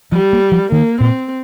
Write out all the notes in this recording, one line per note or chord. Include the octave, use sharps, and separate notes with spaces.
F3 G3
A#3
F3
D#3 A#3
A#2 C4